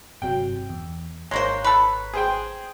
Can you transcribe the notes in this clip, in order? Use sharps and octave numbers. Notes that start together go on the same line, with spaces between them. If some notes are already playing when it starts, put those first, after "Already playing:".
G1 C3 F#3 G5
E2
G#1 G#3 A#3 C5 C#5 A#5 C6 F#6
A4 B4
G#4 C5 G5